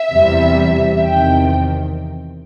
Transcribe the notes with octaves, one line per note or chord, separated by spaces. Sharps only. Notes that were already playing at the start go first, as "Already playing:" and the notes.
Already playing: E5
E2 C3 E3 G3
E2 C3 D#3 G5